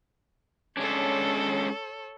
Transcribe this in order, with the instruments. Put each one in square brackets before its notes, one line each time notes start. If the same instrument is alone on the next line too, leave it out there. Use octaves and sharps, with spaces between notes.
[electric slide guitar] G#3 C#4 D4 [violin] A4 C#5